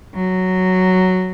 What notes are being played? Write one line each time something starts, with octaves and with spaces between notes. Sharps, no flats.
F#3